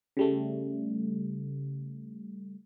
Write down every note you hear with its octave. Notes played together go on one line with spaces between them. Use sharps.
C#3 G3 A3